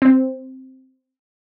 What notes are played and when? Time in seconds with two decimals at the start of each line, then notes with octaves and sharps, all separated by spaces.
0.02 C4